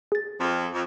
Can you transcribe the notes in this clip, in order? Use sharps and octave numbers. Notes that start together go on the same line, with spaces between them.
G#4 A6
F2
F2